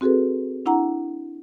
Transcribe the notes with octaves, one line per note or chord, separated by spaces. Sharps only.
C4 F#4 G#4 A4 B4
D4 E4 F#5 A#5